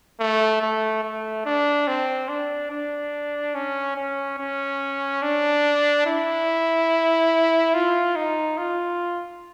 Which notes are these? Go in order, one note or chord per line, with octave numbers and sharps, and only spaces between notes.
A3
A3
A3
D4
C4
D4
D4
C#4
C#4
C#4
D4
E4
F4
D#4
F4